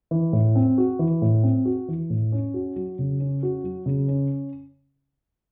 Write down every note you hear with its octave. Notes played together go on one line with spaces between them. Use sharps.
E3
A2
C4
F#4
E3
A2
C4
F#4
E3
A2
C#4
F#4
F#3
C#3
C#4
F#4
F#3
C#3
C#4